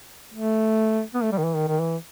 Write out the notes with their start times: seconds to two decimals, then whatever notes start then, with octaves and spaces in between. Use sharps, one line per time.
0.34 A3
1.14 B3
1.23 A3
1.32 G3
1.38 D#3
1.44 E3
1.55 D#3
1.68 D#3
1.80 E3